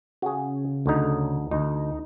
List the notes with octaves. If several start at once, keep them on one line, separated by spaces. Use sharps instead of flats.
C#3 F#4 G#4
D2 D3 D#4
D2 D#4